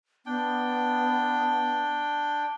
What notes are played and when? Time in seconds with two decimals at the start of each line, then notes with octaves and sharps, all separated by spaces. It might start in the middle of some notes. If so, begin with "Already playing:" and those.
0.26 B3 D4 G5